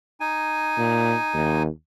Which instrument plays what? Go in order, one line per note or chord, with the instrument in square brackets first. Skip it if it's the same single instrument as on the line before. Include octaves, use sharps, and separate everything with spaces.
[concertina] D#4 G#5
[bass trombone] A#2
D#2